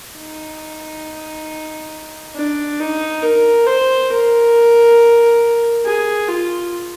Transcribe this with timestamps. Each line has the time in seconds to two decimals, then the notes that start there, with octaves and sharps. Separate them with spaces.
0.17 D#4
2.35 D4
2.80 D#4
3.23 A#4
3.66 C5
4.10 A#4
5.85 G#4
6.29 F4